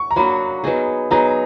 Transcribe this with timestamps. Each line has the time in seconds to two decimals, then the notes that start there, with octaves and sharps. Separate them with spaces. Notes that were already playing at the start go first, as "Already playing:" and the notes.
Already playing: C#6
0.11 A#5
0.16 F#3 A#3 D4 F#4 B5
0.64 F#3 B3 D#4 G#4
1.11 F#3 B3 D#4 G#4 A#5